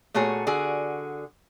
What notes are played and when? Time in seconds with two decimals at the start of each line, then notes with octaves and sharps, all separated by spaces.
0.14 A#2 A3 F#4 G#4 C#5
0.47 D3 F#4 G#4